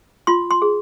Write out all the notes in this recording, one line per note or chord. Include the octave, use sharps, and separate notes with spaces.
F4 C6
C6
G#4